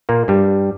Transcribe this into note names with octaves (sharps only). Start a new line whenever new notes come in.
A#2 A#3
G2 G3